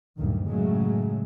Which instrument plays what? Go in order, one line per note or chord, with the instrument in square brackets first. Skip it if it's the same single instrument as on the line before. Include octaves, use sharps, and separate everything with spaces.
[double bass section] F#1 D2 G2 A#2 D#3
A2 C#3 F#3 G#3 A3